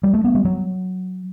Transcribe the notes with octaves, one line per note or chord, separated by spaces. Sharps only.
G3
A3
B3
G3
F#3